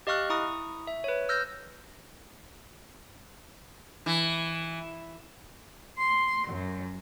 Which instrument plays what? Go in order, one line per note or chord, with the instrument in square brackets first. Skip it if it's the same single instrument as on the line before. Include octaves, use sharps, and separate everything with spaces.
[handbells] G4 D#5 F5 C#6 F6 F#6
E4 A#5 C#6 D#6
E5
B4 C#5
E6 F6 G6 A#6
[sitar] E3
[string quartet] C6
F#2